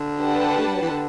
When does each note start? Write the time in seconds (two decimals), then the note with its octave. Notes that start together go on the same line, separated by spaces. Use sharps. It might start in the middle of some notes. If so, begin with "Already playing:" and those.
Already playing: D3
0.20 D4 G4 B4 F#5 A5
0.59 A3
0.67 G3
0.75 F#3
0.82 E3
0.90 D3